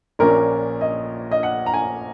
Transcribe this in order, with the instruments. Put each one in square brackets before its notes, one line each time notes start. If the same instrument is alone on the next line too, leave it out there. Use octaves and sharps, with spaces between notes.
[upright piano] A#1 A#2 A#3 C#4 A#4
D#5
D#5
F#5
A#5
G#5